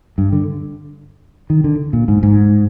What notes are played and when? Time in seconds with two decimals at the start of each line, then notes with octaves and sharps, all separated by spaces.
0.18 G2
0.32 D3
1.50 D#3
1.64 D3
1.93 A#2
2.08 G#2
2.23 G#2